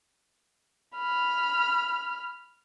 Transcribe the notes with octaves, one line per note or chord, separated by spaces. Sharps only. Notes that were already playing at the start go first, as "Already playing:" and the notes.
B5 F6